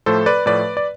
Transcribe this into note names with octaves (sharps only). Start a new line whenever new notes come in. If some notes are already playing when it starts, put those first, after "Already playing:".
A2 F3 A3 A4 C5
B4 D5
A2 F3 A3 B4 D5
D5